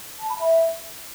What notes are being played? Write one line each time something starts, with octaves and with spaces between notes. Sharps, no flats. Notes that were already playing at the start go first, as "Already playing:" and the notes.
A5
B5
E5